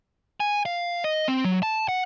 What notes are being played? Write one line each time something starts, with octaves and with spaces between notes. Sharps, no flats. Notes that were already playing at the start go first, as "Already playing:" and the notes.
G#5
F5
D#5
C4
F#3
A5
F#5